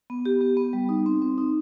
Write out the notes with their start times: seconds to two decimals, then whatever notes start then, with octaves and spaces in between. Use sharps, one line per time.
0.10 B3
0.26 G4
0.41 B3
0.57 B3
0.73 G3
0.89 D#4
1.06 C4
1.22 C4
1.38 D#4